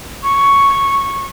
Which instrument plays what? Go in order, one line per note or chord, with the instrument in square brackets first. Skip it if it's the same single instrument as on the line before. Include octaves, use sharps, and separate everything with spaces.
[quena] C#6